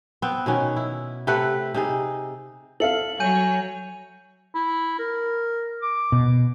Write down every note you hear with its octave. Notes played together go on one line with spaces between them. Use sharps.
B3 C4
B2 D#3 C#4
E4
C3 A3 B4 F#5
C3 D#4 G#4
A4 E5 F5 C#7 F#7
F#3 C#5 G#5 G6 D#7
E4
A#4
D6
B2